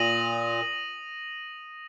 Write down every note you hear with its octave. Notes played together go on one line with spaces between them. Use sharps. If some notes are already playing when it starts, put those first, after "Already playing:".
Already playing: A#2 D#6 A#6 D#7 F#7